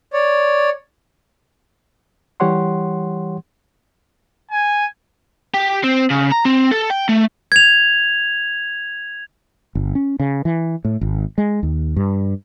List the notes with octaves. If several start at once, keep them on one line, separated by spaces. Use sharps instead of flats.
C#5 D5
E3 G3 G4 C#5 F#5 C6
G#5
G4
C4
C#3
A#5
C4
A4
G5
A3
G#6 F7
G1
C#4
C#3
E3
A2
G#1
G#3
D#2
G2